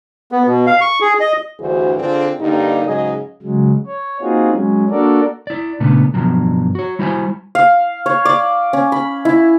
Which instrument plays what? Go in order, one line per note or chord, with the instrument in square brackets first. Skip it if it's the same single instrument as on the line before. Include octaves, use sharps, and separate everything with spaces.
[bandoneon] B3
B2
F5
C#6
G#4
D#5
[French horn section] D2 G2 E3 F#4 G#4 C5
D3 C4 D4 F4 G#4
G2 D3 G3 A#3 D#4
G#2 C#3 F#3 G#4 D#5
[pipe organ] C#3 F#3 G#3
C#5
A#3 C4 D#4 F4 F#4 G#4
F#3 G#3 C#4
A#3 D4 F#4 A4 A#4 D5
[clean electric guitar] E4 D5
A#2 C#3 A3 B3 D4
G2 B2 F3 F#3
F#4 C#5
G3 E4 F#4 C5 F#5 G#5
[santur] F5
C#5
D5
C#4
B5
E4